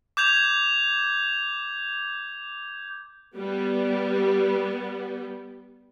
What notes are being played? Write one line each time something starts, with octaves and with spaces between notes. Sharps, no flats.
D6 G6 G#6 F7
G3 B3